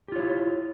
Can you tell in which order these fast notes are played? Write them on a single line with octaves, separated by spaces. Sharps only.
G4 F4 C#5 E4